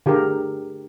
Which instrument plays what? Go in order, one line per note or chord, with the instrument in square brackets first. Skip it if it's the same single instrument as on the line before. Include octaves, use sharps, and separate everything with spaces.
[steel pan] D3 G4 G#4 A#4